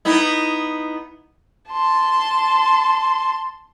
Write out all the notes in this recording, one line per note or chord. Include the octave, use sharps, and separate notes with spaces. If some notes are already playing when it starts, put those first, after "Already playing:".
B3 D#4 E4
A5 C6